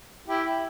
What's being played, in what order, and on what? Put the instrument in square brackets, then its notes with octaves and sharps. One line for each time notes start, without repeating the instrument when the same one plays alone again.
[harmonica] E4 G4